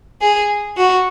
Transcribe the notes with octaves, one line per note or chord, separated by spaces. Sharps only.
G#4
F#4